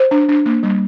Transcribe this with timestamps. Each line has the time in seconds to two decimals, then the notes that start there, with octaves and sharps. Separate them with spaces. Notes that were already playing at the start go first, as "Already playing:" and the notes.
Already playing: C5
0.11 D4
0.29 D4
0.46 A#3
0.63 G3